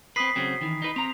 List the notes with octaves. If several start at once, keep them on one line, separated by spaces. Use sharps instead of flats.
C4 B4 D#6 B6 C7
C#3 F#3 C4
D#3 E3
D#4 B4
C4 A#5 F7